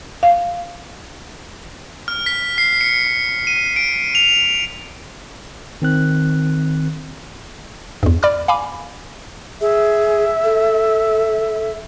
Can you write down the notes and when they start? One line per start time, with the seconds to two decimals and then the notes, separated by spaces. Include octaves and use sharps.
0.23 F5
2.08 F6
2.26 B6
2.58 C7
2.81 C#7
3.47 D#7
3.76 D7
4.15 F7
5.82 D#3 C4 F#6
8.03 E2 G2
8.23 D5 B5 D6 F6
8.48 F5 G#5 B5 D6
9.61 G#4 E5
10.44 A4